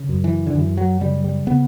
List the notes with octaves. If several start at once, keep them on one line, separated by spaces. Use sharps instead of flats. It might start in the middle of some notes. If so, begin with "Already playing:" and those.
Already playing: C#3
F#2
E3
D3
F#2 E3
F#3
C#3 G3
G3
C#3 B3